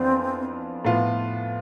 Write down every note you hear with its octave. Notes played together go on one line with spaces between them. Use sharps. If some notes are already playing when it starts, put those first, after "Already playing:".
Already playing: F2 E3 B3 C4 D4 F4
A2 F3 B3 F4